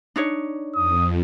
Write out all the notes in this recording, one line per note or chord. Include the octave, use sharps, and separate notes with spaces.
D4 D#4 C#5
F2 D#6